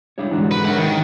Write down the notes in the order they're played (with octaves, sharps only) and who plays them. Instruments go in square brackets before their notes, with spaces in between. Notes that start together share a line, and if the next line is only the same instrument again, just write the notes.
[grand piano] G3 E4 [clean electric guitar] D4 G4 C#5
[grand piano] G#2 D3 [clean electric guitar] E3 D4 F#4
[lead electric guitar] B4
[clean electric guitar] A#4 E5 [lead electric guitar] C#5 F#5
[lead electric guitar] D#3